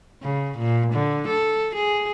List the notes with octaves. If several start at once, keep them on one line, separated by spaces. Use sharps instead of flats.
C#3
A#2
D3
A4
G#4